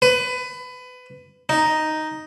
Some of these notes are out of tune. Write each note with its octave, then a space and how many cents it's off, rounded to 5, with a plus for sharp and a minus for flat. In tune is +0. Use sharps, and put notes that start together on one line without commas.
B4 +25
D#4 +0